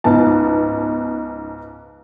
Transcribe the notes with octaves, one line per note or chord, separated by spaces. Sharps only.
C#2 G#2 B3 A5